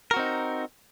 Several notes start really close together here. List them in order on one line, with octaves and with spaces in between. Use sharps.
A#4 F#4 C4 D#4